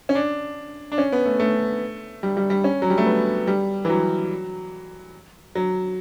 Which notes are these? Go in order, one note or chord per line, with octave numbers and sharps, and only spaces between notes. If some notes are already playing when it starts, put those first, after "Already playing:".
C#4
D4
D4
C#4
B3
A3
A3
G3
G3
G3
C#4
F#3
G3
A3
B3
G3
E3
F#3
F#3